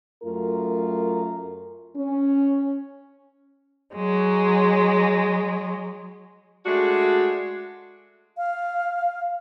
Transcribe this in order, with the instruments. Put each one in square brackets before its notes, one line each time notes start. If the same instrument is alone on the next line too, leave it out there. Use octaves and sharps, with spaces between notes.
[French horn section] F#2 A3 F4 A#4
C#4
[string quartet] F#3 G#3
[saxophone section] G#3 A3 D4 F#4
[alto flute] F5